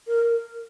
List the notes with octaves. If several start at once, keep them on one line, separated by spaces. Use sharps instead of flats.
A#4